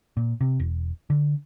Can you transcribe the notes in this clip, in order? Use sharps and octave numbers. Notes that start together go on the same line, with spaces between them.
A#2
C3
E1
D3